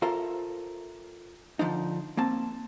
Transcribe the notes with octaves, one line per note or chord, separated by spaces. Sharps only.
F4 A4 A#4 C5 E5
D3 F3 D4 D#4
A#3 C4 A5